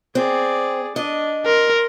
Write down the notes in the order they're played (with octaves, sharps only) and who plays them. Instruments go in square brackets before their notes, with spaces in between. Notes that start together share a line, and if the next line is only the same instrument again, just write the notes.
[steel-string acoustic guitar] C4 [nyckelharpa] G#4 D5
[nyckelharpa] D4 [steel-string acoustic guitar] D#5
[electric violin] A#4 [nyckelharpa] C6